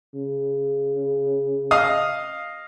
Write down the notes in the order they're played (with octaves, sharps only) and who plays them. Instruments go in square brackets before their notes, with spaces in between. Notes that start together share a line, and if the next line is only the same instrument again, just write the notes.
[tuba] C#3
[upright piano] D#5 F5 D#6